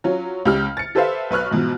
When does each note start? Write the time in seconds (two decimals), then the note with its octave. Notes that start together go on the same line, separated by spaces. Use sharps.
0.04 F#3 C#4 F4
0.45 C#2 G4 F6
0.77 A6 C#7
0.95 G4 A4 B4 C5 E5 F5
1.31 B1 B4 C#6 F6 F#6
1.51 G#2 B2 E3 F3